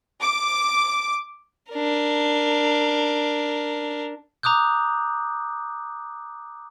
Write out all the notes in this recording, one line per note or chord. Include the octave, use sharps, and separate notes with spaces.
D6
D4 A#4
A#5 D6 D#6 F#6 G6